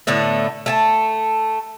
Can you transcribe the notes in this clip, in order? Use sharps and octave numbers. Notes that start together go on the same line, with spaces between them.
A2 D3 A3 B3
A3 G#5 A5